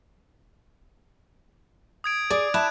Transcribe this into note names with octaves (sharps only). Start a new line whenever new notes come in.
D#6 G#6 D7
G#4 D5
E4 A5 F#6 G#6